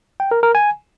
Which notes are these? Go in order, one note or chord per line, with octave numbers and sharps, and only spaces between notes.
G5
A#4
A#4
G#5